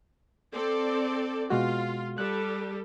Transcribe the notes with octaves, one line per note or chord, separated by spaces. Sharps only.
C4 A4 D5
B2 G#3 F4 F#4
G3 A4 F#6